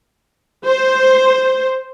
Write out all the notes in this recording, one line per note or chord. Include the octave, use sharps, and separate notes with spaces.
C5